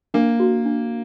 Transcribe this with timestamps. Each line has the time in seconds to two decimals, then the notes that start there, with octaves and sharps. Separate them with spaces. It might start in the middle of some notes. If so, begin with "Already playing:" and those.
0.14 A#3 D4
0.40 F#4
0.65 D4